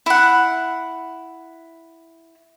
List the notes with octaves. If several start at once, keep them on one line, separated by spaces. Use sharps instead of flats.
E4 F#5